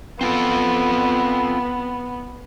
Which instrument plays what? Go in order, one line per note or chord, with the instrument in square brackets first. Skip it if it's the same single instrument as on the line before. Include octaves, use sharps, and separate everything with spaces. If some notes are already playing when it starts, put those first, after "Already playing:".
[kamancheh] B3 [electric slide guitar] C4 F4 A4